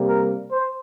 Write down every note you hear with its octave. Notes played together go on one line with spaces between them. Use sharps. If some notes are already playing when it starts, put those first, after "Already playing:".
Already playing: C3 G3 A#3
A#4
C5